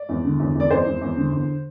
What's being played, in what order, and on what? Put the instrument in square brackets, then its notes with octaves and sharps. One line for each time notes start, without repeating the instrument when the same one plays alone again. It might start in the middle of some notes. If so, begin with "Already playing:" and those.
Already playing: [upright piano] D5
E2
D3
E2
E2 D5
E2 C5
E2
E2
D3
E2